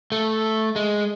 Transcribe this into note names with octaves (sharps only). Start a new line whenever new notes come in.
A3
G#3